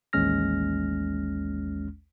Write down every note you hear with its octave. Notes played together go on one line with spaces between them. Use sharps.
A1 D#2 G#3 C#4 F6 A#6